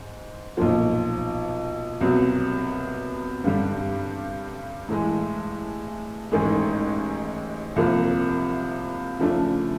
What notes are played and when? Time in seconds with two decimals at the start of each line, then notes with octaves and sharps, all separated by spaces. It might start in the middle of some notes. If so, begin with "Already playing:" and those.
Already playing: G#2
0.57 B1 A#2 F3
2.01 C2 B2 F#3
3.44 G2 D3 G3
4.89 A2 E3 G#3
6.31 A1 G#2 D#3 G#3
7.76 C2 C3 F3 A#3
9.19 C#3 F3 A3 D4